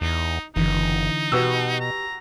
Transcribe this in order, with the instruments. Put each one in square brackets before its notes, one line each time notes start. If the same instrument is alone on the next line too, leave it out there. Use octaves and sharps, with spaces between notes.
[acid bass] E2 [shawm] D#4
[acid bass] F#1 [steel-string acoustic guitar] D3 E3 [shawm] D#4
[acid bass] B2 [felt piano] F#4 B4 E6 [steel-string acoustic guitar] G4
[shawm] A#5